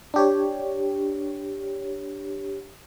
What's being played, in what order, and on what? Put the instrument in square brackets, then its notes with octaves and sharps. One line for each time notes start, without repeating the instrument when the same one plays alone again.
[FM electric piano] D4 G4 C#5